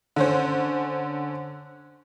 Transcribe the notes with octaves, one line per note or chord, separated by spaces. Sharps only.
D3 C#4 C5